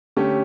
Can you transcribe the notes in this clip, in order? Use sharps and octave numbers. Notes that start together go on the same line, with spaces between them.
D3 A3 C#4 G4